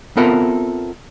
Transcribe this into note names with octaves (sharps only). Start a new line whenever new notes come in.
B3 C4 F4 A4 A#4 E5